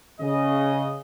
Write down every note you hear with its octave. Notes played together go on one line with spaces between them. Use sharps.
C#3 D#5